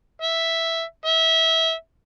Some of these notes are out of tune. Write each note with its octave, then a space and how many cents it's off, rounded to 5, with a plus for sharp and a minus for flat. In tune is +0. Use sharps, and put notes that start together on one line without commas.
E5 +0
E5 -20